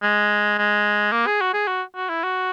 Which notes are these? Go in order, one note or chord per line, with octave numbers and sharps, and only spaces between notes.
G#3
G#3
A#3
G#4
F#4
G#4
F#4
F#4
E4
F#4